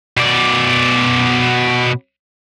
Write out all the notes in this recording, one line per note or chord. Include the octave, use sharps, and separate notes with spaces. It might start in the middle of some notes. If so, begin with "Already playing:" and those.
B2 D5